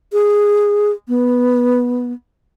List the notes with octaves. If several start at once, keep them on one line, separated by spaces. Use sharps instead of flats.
G#4
B3